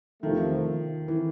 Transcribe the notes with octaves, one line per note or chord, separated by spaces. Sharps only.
E2 C3 D#3 F3 A3
E3